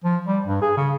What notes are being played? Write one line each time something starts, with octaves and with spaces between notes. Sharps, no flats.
F3
G3
G2
G#4
C#3